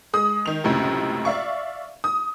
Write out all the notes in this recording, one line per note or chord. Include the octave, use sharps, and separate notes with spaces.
G#3 D#6
D#3 F7
C#2 F#2 A2 C3
D5 E5 F5 C#6
D#6